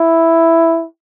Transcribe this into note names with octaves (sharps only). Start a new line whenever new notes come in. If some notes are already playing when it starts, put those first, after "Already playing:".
Already playing: E4